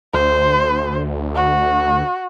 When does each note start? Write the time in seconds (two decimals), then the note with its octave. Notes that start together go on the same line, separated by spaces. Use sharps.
0.14 D2 C5
1.35 F#4